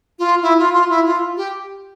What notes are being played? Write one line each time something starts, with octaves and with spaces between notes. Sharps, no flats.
F4
E4
F4
F4
E4
F4
G4